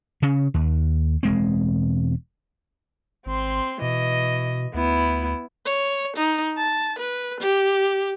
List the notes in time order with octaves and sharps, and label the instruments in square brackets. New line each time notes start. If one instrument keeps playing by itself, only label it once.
[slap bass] C#3 C#4
D#2
E1 G#3 C4
[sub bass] G#1 [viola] C4 C6
[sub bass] B2 [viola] E3 D#5
[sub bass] D2 [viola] B3 E4
[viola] C#5
D#4
A5
B4
G4